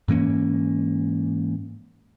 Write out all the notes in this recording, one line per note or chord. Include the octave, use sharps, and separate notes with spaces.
G#2 E3 A#3 C#4